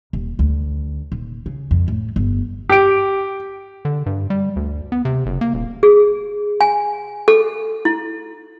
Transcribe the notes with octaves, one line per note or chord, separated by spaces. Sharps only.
D#1
D2
D#1
C#3
F2
A2
G1
G4 D7
D3
G2
G3
D2
B3
C3
F#1
A#3
D#1
G#4
G#5
A4
E4